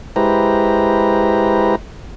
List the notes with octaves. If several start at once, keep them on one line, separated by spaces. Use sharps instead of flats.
G#3 E4 G4 B4 C5 A#5